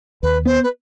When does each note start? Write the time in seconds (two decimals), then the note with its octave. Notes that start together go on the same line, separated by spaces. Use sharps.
0.23 D#2 B4
0.46 B3 C5
0.63 B4